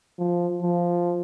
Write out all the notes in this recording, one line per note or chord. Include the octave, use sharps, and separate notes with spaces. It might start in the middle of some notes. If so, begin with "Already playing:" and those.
F3
F3